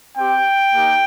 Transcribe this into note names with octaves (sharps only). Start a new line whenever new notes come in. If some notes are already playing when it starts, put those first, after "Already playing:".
C4 G4 G5
A#3 D#4 G4